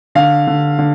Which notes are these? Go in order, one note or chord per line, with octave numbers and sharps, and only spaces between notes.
D3 F5
D3
D3